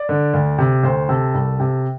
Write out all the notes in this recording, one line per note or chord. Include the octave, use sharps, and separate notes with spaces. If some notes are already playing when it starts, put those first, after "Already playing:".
Already playing: D5
D3
D2
C3
D2 C5
C3 A4
C2
C3